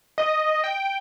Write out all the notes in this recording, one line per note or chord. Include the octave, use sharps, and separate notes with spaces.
D#5
G5